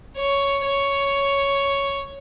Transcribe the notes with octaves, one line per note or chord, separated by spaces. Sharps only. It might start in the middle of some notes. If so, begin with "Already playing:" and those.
C#5
C#5